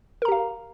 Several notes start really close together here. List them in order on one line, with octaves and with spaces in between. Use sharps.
A#4 A#5 G4 F5